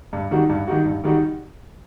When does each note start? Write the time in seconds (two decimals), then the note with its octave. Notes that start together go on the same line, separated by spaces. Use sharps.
0.13 G2
0.31 D#3 G3 D#4 F#4
0.49 G2
0.67 D#3 G3 D#4 F#4
0.86 G2
1.04 D#3 G3 D#4 F#4